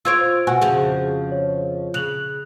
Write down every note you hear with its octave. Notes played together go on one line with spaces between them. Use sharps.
F4 C5 C#5 E6 G#6 D7
B2 F#4 G#5
F2 C#3 F3 G#4
C#5
C#3 F#6 F7 F#7